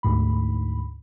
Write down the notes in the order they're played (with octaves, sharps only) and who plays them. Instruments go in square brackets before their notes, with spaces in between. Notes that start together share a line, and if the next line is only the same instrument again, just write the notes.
[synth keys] D2 G#2 B5